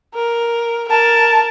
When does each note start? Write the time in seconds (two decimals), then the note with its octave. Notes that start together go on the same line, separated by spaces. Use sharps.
0.15 A#4
0.88 A#4 A5